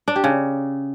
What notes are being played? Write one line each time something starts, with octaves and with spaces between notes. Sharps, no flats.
D4
G4
C#3